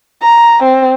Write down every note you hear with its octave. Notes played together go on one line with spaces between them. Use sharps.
A#5
C4